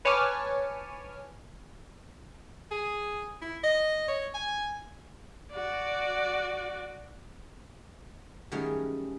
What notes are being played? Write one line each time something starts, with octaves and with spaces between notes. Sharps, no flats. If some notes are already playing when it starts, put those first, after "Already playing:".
B4 C#5 G#5 A5 D6 F6
G#4
E4
D#5
C#5
G#5
F#4 D5
D#3 F#3 G3 A3 C#4 G#4